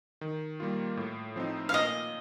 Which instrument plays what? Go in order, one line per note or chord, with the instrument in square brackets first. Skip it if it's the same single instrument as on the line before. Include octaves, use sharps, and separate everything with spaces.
[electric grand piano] D#3
G3 A#3 F4
A2
F3 C4 D#4
[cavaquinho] F5
[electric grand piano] A#2 [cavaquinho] D#5